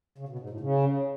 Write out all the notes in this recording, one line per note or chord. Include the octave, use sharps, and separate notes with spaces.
C#3
B2
G#2
A2
C#3